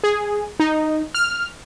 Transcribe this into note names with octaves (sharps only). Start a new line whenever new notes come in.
G#4
D#4
F6